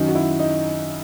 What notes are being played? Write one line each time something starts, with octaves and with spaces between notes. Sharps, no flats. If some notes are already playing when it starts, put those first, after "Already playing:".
Already playing: F#2 D#3 F#3 D#4
F#4
E4
D#4